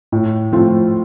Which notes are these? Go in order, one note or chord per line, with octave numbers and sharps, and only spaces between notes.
A2
F3 A3 C4 F4